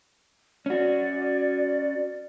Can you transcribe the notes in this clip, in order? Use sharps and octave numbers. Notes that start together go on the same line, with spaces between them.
C#4 F#4 D5